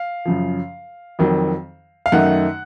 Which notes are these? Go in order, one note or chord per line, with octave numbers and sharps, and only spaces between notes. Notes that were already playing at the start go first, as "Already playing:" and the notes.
Already playing: F5
F#2 C#3 F3
F2 D#3 F#3
F5
F#2 D#3 A3 D#4 F#5